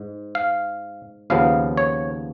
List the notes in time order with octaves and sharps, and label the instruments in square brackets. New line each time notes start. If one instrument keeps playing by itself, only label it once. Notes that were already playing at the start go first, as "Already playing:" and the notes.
Already playing: [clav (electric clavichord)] G#2
F5
D#2 C#3 F3 B3 F5
C#5